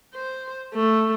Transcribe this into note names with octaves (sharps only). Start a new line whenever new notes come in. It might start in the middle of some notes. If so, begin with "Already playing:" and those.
C5
A3